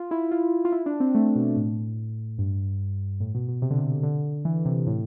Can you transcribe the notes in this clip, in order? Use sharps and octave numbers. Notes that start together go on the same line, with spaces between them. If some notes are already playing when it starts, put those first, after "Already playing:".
Already playing: F4
E4
F4
F4
E4
D4
C4
A3
B2
A2
G2
A2
B2
B2
C3
D3
C3
D3
E3
C3
A2